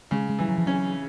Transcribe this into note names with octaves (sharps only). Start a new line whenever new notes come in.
C#3 G#3
G#3
E3 G3
F#3
F3
F#3 C#4